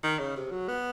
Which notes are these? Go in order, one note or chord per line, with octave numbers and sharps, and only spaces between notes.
D#3
C#3
C3
F#3
B3